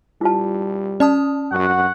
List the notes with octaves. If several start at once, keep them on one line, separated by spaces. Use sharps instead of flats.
G3 E4 F4 A5
C#4 D5 A5 D#6
F#2 F#4 F#5